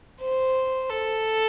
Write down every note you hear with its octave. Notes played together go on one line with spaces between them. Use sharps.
C5
A4